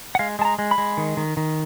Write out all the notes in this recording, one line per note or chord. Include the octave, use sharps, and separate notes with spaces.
F#5
G#3 F5
G#3 A5
A#5
G#3
B5
G#3
D#3
D#3
D#3